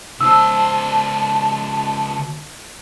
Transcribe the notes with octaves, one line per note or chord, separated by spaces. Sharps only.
C#2 C5 A5 E6